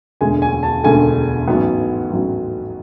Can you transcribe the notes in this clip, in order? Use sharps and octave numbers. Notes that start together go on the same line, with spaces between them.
E1 D2 D3 G#3 G#5
G#5
A5
E1 D2 D3 G#3 G#5
A1 G#2 F#3 B3
A1 G#2 F#3 B3